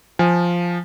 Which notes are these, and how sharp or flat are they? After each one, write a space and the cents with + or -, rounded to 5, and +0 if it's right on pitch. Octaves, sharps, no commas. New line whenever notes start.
F3 +0 G#5 +0